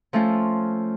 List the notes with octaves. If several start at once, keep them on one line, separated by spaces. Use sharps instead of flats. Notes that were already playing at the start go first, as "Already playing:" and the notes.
F3 A3 C#4 F4